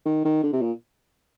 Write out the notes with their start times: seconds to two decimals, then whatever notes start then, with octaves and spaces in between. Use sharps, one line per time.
0.06 D#3
0.25 D#3
0.43 D3
0.53 C3
0.62 A#2